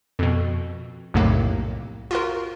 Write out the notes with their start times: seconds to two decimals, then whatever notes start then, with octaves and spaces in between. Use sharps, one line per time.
0.19 F2 B2
1.14 B1 F2 A2 C3 A#3
2.11 F4 F#4 A#4